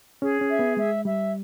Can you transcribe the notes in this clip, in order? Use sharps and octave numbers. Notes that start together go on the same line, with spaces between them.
C#4 G#4
C#4
E5
B3
G#3 E5
G3 E5